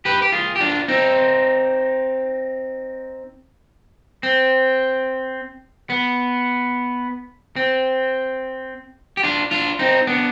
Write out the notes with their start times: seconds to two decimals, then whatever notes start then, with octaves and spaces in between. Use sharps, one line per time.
0.05 G4 B4
0.22 G4
0.32 F4 G#4
0.56 G4
0.61 D4 F4
0.88 C4 D#4
4.23 C4
5.90 B3
7.56 C4
9.17 G4
9.23 D4 F4
9.51 D4 F4
9.79 C4 D#4
10.07 B3 D4